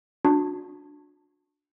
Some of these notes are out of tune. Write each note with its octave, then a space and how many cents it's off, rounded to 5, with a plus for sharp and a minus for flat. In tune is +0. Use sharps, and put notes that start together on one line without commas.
D4 +0 F#4 -35